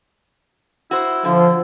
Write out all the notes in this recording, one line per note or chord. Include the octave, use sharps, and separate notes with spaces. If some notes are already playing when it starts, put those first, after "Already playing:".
E4 F#4 C5
D3 F3